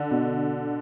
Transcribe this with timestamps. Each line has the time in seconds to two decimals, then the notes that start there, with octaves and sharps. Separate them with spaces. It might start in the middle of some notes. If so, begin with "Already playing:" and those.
Already playing: D3
0.11 B2